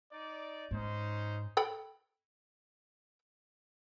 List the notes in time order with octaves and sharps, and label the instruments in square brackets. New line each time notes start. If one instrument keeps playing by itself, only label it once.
[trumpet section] D#4 D5
[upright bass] G#2 [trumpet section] C#4 D#4 C5
[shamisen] A4 G5 B5